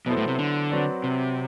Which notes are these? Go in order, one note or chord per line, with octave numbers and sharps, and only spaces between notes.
B2 F#3 B3 E4 A4 C5
A2
C3
D3
F#3 C4 F#4 B4 D5
C3